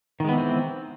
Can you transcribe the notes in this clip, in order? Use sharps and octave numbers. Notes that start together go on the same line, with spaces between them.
D#3 E3 G#3 B3 C4